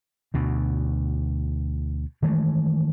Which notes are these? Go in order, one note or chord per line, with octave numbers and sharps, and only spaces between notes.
D2 B2
D#3 E3 G#3 A3